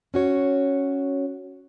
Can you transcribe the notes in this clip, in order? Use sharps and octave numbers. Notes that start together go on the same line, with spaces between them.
C#4 F#4 C#5